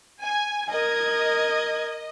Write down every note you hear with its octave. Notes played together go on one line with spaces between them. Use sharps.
G#5
A#4 D#5 G#6